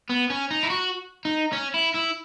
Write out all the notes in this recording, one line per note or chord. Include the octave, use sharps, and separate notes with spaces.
B3
C#4
D#4
E4
F#4
D#4
C#4
E4
E4